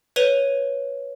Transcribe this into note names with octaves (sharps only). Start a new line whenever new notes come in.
B4 C#5 D#7 F7 G7